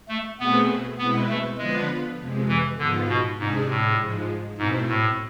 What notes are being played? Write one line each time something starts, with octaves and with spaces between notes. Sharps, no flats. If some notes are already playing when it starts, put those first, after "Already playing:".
A3
B2 A3 B3 C4 G#4 B4
B2 G#3 B3 C4 E4 B4
A3
D3 F3 G#3 B3 F4 B4
F2 C3 G#3
E3
G#2 D3 F3 B3 F4
B2
G#2 C3 G#3 D4 G#4
A2
G#2 F3 G#3
G#2 B2 A3 C4 E4
A2